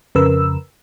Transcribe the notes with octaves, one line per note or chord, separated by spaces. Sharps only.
F2 C#3 A#4 B4 E6